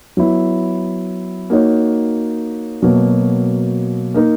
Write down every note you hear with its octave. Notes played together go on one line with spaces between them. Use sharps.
F#3 B3 E4
A#3 D#4 F#4 C#5
B2 F#3 A#3
A#3 D#4 A#4